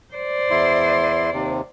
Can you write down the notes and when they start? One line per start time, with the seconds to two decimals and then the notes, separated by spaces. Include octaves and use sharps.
0.14 C5 D5
0.50 E2 E4 C6
1.33 D#2 C3